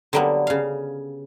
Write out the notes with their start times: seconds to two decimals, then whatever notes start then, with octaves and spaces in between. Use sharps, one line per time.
0.13 D3 F#3 G3 A#3 B3
0.47 C#3 F5